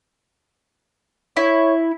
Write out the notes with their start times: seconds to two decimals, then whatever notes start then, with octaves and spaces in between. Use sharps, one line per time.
1.37 E4 C#5